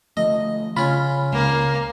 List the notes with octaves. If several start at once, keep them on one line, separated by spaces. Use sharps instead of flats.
D3 F3 A3 D#5
C#3 C#4 F4 B5
C#2 A#3 F5